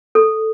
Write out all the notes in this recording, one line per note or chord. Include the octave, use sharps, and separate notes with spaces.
A4